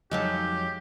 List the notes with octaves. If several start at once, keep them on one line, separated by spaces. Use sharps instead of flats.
F2 F#3 G#3 D#4 G4 F5 A5